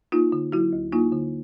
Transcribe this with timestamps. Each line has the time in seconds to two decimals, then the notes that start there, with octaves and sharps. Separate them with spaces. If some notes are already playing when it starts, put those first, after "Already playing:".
0.12 A#3 D#4 F4
0.32 D3
0.52 F#3 E4 F#4
0.73 D2
0.92 A#3 D#4 F4
1.12 D3